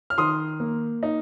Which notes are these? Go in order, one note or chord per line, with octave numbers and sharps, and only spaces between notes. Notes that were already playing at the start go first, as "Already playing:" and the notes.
F6
D#3 C6 D#6
A#3
D#4